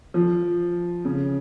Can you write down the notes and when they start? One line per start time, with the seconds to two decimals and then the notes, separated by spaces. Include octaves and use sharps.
0.14 F3
1.05 C#3